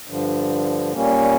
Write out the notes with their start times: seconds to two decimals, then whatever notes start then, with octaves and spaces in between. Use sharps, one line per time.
0.08 G2 D3 F3
0.92 A#2 G3 A#3 C#4